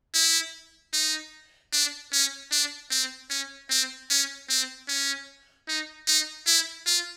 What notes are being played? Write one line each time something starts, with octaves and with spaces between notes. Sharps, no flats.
E4
D#4
D4
C#4
D4
C4
C#4
C4
C#4
C4
C#4
D#4
D#4
E4
F4